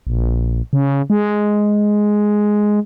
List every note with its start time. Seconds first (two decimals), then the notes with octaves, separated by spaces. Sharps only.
0.07 A#1
0.73 C#3
1.10 G#3